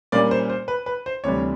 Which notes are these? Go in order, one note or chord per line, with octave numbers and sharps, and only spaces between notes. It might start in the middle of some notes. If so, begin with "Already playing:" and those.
A#2 G3 A#3 C#4 D5
C5
C5
B4
B4
C5
D2 C3 E3 G3 C#5